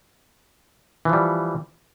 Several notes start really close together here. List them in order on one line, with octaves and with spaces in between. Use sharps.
E3 F3 G3